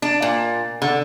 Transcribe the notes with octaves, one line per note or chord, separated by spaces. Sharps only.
D4
A#2
D3